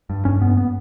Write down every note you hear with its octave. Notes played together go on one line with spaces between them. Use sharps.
G2
G2 C#4
G2 B3
B3